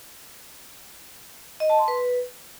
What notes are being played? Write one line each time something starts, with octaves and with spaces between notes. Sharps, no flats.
D#5
A5
C6
B4